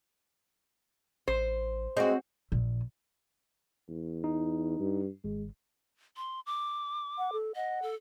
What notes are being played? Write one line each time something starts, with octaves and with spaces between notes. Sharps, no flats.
A1 C5
G#3 C4 F#4
A#1
E2
D#4
G2
G#1 G#3
C6
D6
F#5
A4
D#5 F#5
A4